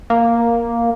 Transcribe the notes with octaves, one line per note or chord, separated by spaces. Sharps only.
A#3